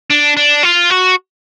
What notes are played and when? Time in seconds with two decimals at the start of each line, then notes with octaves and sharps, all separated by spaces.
0.10 D4
0.37 D4
0.63 F4
0.90 F#4